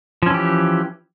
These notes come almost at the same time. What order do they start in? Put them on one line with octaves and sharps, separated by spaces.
F3 C#4 E3 G4